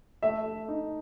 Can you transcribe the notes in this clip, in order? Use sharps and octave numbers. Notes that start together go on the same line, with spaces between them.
A3 E5
A3
D#4